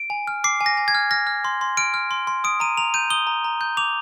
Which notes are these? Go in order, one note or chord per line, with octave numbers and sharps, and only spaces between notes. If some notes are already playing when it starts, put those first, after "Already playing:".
Already playing: D7
G#5
F6
D6 C7
G#5
A#6
G#5
G#6
F6
F6 A#6
F6
C6
C6
F6 D7
F6
C6
C6
D#6 D7
A#5 D#7
A#5 F7
G6 D#7
D#6 G7
A#5
A#5
G6
D6 F7